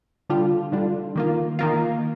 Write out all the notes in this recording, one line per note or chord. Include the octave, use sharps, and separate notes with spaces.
D3 G3 D4 F4
D3 G3 D4 F4
D#3 A#3 F4
D#3 A#3 F4